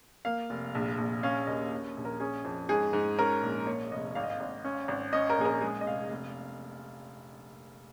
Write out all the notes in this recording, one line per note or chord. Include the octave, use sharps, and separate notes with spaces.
A#3 F5
F1
A#1
A#1
C#4 F5
D#2 D#5
C#4
A#1
A#4
C#4 G#4
F2
G#2 G#4
G#2
C#4 A#4
A#1
A#3 C#5
F1 D#5
G#1 F5
D#5
F5
G#1
C#4
G#1
C#4 D#5
A#4
A#1 G#4
A#4
G#3 G#4
D#5
F1 F5
F1